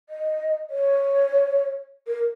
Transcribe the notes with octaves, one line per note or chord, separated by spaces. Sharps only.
D#5
C#5
A#4